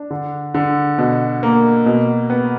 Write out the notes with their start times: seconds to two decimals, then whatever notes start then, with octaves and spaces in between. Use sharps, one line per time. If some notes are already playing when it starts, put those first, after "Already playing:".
Already playing: D4
0.11 D3
0.54 D3
0.98 B2
1.43 A#3
1.86 B2
2.30 B3